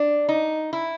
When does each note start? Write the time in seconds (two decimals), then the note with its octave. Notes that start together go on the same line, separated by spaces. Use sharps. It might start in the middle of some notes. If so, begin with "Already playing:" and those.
Already playing: D4
0.29 D#4
0.73 E4